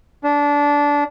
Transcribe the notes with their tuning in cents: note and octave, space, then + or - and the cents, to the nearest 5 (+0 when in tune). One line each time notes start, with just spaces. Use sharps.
D4 -20